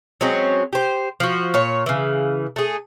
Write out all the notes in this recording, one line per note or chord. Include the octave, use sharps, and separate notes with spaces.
F#3 G#3 C4 C#4
G4 C5
F3 F#4
A#2 C#5
C#3 E3
A3 G#4